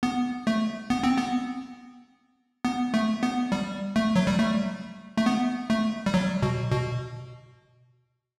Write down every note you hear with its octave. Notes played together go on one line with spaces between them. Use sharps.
B3
A3
B3
C4
B3
B3
A3
B3
G3
A3
F#3
G3
A3
A3
B3
A3
G3
F#3
B2
B2